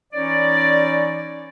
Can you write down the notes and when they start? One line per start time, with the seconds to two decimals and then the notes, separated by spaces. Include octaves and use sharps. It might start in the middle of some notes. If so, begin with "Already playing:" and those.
0.13 E3 C#4 D#4 C#5 D5